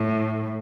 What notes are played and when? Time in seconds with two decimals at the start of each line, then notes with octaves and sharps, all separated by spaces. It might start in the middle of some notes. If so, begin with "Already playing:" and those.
Already playing: A2